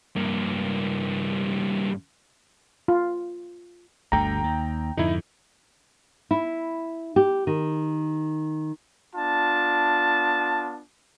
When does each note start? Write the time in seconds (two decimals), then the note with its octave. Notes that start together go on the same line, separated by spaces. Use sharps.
0.16 G2 A#3
2.88 F4
4.12 G1 D2 D3 G5 A#5
4.44 D#2
4.97 F2 G#2 D3 D#4 E4
6.31 E4
7.16 G4
7.47 D#3
9.15 B3 D4 F4 A5